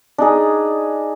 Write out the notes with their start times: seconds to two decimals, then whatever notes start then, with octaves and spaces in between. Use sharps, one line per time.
0.18 D4 D#4 G#4